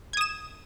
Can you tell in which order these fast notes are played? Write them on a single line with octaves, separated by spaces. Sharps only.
G#6 D#6 E7